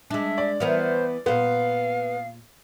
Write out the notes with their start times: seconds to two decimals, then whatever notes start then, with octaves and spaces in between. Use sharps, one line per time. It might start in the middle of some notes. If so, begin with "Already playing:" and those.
0.11 G#3 D4 E5
0.38 D5
0.60 E3 B3 A#4 C5
1.26 A#2 B3 C5 F5